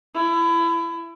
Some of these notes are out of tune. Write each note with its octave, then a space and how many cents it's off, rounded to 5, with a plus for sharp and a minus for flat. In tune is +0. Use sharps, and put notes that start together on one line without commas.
E4 +25